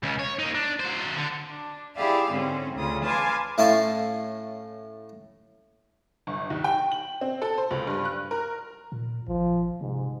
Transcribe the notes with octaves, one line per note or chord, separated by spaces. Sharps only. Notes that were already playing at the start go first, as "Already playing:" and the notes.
C#2 C#3
C#5
A#3 D#4
D4
F#3 C5
D3
D4
E4 G4 G#4 D5 E5 F5
G#2 D3 C4 C#4
D2 C#3 F4 D#6
B4 F5 G#5 A5 C6 D6
A2 A3 C#4 E4 F5 A5
G1
D#2
G5
F#7
C4
A4
C5
C#2
G2
F#6
A#4
A#2
G#1 F3
G#2 C3